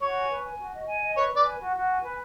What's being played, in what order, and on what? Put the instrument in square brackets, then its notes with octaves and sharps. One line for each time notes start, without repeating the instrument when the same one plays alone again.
[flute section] F#4 [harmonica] C#5
[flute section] G#5
B4
G#5
F#4
D#5
G#5
D#5
[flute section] B4 [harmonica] C#5
[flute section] B4 [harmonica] D5
[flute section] G#5
F#4
F#4
G#5
B4